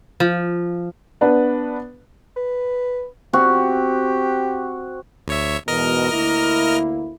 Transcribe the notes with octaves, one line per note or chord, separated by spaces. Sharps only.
F3
B3 D4 B4
B4
C4 F#4 G4
D2 C#5 E5
E2 G#2 B2 A#4 D#5 F6
D2 A#3 E4